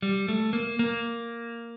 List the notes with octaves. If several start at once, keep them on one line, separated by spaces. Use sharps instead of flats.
G3
A3
A#3
A#3